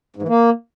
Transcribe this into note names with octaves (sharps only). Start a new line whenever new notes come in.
G#2
E3
A#3